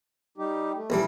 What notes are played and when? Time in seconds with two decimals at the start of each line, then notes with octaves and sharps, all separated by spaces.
0.38 G3 D#4 G4
0.75 A3
0.90 A#1 E3 G3